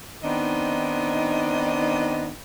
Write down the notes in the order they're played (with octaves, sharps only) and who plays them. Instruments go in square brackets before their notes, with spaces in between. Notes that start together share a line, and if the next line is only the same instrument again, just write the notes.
[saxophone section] D#3 B3 C4 D4 D#4 D#5